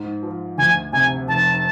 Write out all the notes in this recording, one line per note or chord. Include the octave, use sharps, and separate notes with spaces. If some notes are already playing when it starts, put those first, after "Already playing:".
Already playing: G#2
F3
D2 G#5
C3 G#5
F1 A5